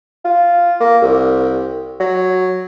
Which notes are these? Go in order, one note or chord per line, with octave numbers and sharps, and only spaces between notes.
F4
A#3
C2
F#3